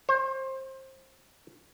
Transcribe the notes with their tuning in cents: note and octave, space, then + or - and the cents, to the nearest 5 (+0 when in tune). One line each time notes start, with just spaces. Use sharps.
C5 +25